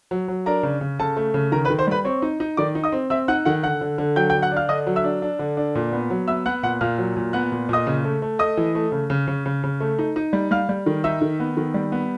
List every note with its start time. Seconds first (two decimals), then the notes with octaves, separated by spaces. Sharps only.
0.11 F#3
0.28 F#3
0.46 D4 A#4 A#5
0.63 C#3
0.81 C#3
0.99 C#3 A4 A5
1.17 A3
1.34 C#3
1.52 D#3 A#4 A#5
1.65 B4 B5
1.70 D#3
1.79 C5 C6
1.87 G3 B4 B5
2.05 C4 C#5 C#6
2.22 D#4
2.40 D#4
2.57 D#3 D5 D6
2.75 D#4
2.84 D#5 D#6
2.92 C4
3.10 C4 E5 E6
3.28 D#4 F#5 F#6
3.45 D#3 F#5 F#6
3.63 D3 F#5 F#6
3.81 D3
3.98 D3
4.16 F#3 G5 G6
4.30 G5 G6
4.34 D3
4.42 F#5 F#6
4.52 D4 F5 F6
4.69 D3 D#5 D#6
4.87 F#3
4.96 E5 E6
5.04 D4
5.22 D4
5.39 D3
5.57 D4
5.75 A#2
5.93 B3
6.10 F#3
6.27 B3 E5 E6
6.46 B3 F#5 F#6
6.63 A#2 F#5 F#6
6.81 A#2 F5 F6
6.98 F#3
7.17 A#2
7.33 B3 F#5 F#6
7.52 A#2
7.69 A#2 D#5 D#6
7.87 C#3
8.04 A3
8.22 A3
8.39 A3 D#5 D#6
8.57 E3
8.75 A3
8.92 C#3
9.10 C#3
9.28 C#3
9.46 C#3
9.64 C#3
9.81 A3
9.99 D#4
10.16 D#4
10.33 G3
10.51 G3 F5 F6
10.69 G3
10.86 D#3
11.04 D#4 E5 E6
11.22 D#3
11.40 B3
11.57 D#3
11.74 G3
11.92 B3